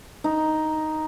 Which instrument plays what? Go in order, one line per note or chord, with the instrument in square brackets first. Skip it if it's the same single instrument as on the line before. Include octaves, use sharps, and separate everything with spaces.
[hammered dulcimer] D#4